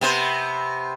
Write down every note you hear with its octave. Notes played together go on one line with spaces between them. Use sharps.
C3 B3 C5